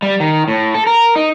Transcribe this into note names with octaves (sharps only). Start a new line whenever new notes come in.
G3
D#3
A2
A4
A#4
D#4